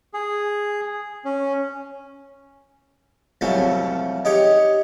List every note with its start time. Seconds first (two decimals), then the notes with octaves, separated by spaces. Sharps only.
0.14 G#4
1.25 C#4
3.41 C2 F2 F#3 A3 C#4
4.25 D#4 G4 C#5